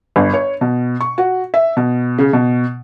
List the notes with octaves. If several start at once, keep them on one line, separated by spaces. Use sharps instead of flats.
G1
C#5
B2
C#6
F#4
E5
B2
C#3
B2